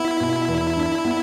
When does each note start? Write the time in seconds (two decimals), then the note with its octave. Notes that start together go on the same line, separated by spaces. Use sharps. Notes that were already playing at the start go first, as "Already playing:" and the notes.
Already playing: B3 E4
0.20 B2
0.48 E2
0.77 D4
1.05 B3